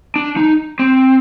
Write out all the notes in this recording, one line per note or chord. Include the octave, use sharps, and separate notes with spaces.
D4
D#4
C4